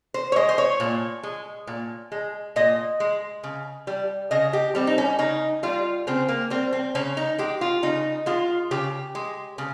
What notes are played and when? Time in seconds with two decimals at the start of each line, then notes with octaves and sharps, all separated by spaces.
0.14 C5
0.32 C#5
0.36 G#3 D#5
0.49 C5
0.58 C#5
0.80 A#2
1.23 G#3
1.67 A#2
2.12 G#3
2.56 A#2 D#5
3.00 G#3
3.44 C#3
3.87 G3
4.31 C#3 D#5
4.53 G4
4.75 G3 C4
4.87 D#4
4.98 C#4
5.19 C#3 D#4
5.63 G3 F4
6.07 C#3 C4
6.29 A#3
6.50 G3 C4
6.73 C4
6.95 C#3 C#4
7.17 D#4
7.38 G#3 G4
7.61 F4
7.83 C#3 D#4
8.26 G#3 F4
8.71 C#3 G4
9.15 G#3
9.58 C#3